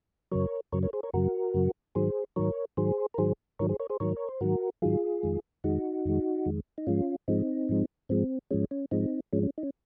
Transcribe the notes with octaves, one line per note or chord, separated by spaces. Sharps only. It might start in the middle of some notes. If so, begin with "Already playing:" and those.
F#2 C#3 F#3 A#4 C#5
F#2 C#3 F#3 A#4 C#5
A#4 C#5
G#4 C5
A#4 C#5
F#2 C#3 F#3 F#4 A#4
F#2 C#3 F#3
G#2 D#3 F#3 G#4 C5
G#2 D#3 F#3 A#4 C#5
G#2 D#3 F#3 G#4 C5
A#4
G#2 D#3 F#3 G#4 C5
G#2 D#3 F#3 A#4 C#5
G#4 C5
A#4 C#5
G#4 C5
G#2 D#3 F#3 A#4 C#5
C#5
C5
G#2 D#3 F#3 F#4 A#4
G#2 D#3 F#3 F4 G#4
F2 D#3 G#3
F2 D#3 G#3 D#4 F#4
F2 D#3 G#3
F2 D#3 G#3
D#4
G#2 F3 G#3 C#4 F4
G#2 F3 G#3 C4 D#4
G#2 F3 G#3
G#2 F3 G#3 C4
G#2 F3 G#3 C#4
C#4
G#2 F3 G#3 C4 D#4
G#2 F3 G#3 C#4
C#4
D#4
C#4